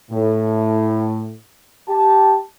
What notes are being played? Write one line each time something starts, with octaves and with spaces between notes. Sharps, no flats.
A2
G4 A5